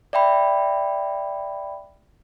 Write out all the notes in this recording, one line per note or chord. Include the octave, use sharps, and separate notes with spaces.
D5 E5 G5 B5